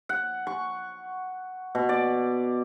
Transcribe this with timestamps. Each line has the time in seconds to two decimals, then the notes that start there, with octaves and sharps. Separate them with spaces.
0.09 F#5
0.47 C#6
1.75 B2
1.89 D5